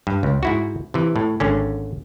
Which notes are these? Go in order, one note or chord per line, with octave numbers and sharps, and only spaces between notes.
G2
C#2
G#2 E4 F#4
C3 E3
A2
G#1 D3 C#4